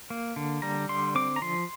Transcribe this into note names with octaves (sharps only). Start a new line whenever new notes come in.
A#3
D3
G3 A#5
D3 C6
C4 D6
A#5
F3 C6